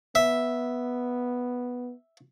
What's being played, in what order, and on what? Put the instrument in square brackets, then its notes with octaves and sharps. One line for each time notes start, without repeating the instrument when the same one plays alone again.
[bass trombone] B3 [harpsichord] E5